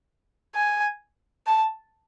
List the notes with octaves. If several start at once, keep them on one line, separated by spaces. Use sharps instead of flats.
G#5
A5